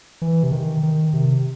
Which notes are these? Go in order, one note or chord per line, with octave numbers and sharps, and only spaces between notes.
E3
C3
D#3
D#3
C3